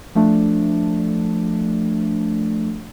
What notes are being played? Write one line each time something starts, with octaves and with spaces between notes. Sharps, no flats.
F3 A3 D4